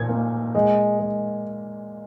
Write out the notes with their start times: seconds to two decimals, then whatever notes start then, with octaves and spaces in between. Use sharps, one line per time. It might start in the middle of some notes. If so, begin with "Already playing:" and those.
Already playing: A#2 G#6
0.09 A#3
0.55 G#3
1.00 G#3